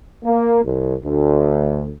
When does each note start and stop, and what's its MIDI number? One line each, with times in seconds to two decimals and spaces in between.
0.24 0.63 58
0.64 0.95 36
1.04 1.93 38